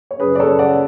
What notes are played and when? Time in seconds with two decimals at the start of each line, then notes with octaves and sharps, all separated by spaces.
0.11 C#5
0.20 F#2 C#3 F#3 C#4 G#4 B4
0.35 D5
0.40 A4 C#5
0.59 D5 F#5